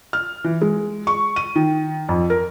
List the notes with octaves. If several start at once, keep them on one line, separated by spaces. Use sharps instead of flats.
F6
E3
G#3
C#6
D#7
D#3
F2
A#4